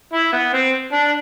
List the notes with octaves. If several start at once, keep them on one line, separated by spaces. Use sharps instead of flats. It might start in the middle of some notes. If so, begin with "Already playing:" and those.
E4
B3
C4
D4